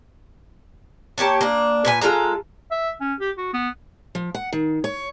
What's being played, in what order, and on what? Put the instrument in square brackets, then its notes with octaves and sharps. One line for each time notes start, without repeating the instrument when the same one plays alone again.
[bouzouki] A#3 G4 C#5 A5
A#3 D4
A#2 B4 G#5
G#3 F4 A4 A#5
[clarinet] E5
C#4
G4
F#4
B3
[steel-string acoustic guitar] F3
F#5
D#3
C#5